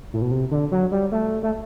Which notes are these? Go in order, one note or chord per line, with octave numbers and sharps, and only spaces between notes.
A2
B2
C3
D3
F#3
G3
A3
A3